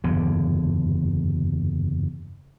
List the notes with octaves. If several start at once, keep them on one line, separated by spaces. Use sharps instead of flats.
F#1 E2 G2 D3